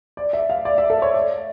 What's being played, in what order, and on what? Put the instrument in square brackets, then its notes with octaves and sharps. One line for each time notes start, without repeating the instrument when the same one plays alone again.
[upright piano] D5
E5
F5
D5
E5
A4
C#5
D5